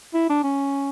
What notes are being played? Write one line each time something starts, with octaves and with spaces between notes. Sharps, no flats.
E4
D4
C#4